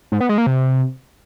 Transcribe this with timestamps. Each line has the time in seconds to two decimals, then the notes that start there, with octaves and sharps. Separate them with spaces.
0.12 G#2
0.21 B3
0.29 G#3
0.38 A#3
0.47 C3